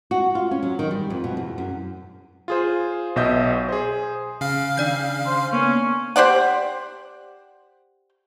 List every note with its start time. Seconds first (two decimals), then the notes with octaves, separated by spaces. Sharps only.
0.11 F#4
0.35 F4
0.51 C#4
0.62 F#3
0.79 D#3
0.91 G3
1.10 F2
1.24 B2
1.37 E2
1.58 F#2
2.48 F4 G#4 C5
3.16 B1 B2 D#5 E5 G6
3.69 G#4 C5
4.41 C#3 F5 C7
4.78 D#3 D4 D5 G6
5.26 C5 C6
5.52 A#3 B3 C#4
6.16 G4 C5 D5 F#5